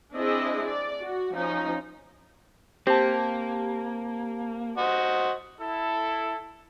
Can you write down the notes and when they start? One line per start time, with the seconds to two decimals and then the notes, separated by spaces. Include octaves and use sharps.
0.14 C4 D4 E4 G#4 D#5
0.67 D5
1.01 F#4
1.34 F3 C#4 D#4
2.87 A#3 C4 G4 A5
4.78 F#4 C5 D#5
5.60 E4 A4